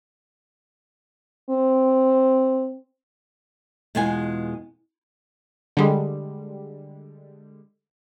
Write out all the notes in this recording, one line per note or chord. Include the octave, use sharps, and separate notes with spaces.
C4
E2 B2 G#3 B3 F4 G#5
D3 G3 G#3